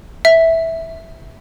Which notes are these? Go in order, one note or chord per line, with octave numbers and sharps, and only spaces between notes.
E5